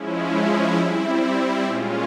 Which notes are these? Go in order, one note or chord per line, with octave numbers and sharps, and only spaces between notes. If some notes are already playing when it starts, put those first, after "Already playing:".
Already playing: F3 G#3 C#4 E4
G3 C4 E4
A#2 G#3 C#4 F4